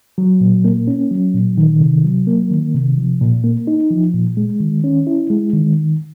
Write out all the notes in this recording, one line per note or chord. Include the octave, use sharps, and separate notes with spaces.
F#3
A#2
A#3
C#4
F#3
A#2
D#3
C3
F#3
A#3
D#3
C3
F3
A#2
A#3
D#4
F3
A#2
G#3
D#3
C#4
E4
G#3
D#3